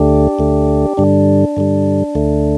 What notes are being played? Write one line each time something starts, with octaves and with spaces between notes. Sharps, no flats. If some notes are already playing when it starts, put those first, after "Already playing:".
Already playing: D2 D3 A3 D4 G4
D2 D3 A3
G2 D3 G3 D4
G2 D3 G3
D2 D3 A3